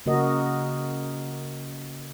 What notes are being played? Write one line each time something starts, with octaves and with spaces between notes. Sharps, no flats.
C#3 A#3 F#4 A#4 D#5